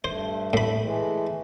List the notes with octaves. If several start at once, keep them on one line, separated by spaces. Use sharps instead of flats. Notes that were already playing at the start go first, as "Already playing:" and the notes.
G2 A3 C5
A2 B5
E3 G#3 A3